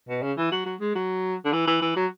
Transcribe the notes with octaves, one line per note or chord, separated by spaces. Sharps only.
B2
C#3
E3
F#3
F#3
G#3
F#3
D3
E3
E3
E3
F#3